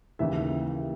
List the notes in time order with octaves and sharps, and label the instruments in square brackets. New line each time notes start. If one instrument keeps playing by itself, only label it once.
[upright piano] D#2 C#3 E3 E5